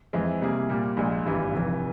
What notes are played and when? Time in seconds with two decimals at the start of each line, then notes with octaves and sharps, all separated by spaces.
0.13 F2 E3 G#3 C4 E4
0.41 C3 G3 A#3 E4 G#4
0.70 A#2 G3 A#3
0.97 A#1 A#2 G#3
1.25 G#1 G2 E3 G3
1.53 F1 F2 E3